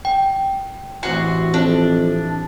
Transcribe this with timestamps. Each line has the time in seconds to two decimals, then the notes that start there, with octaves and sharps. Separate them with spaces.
0.05 G5
1.03 A1 C3 F#4 B4 C6
1.54 F2 D4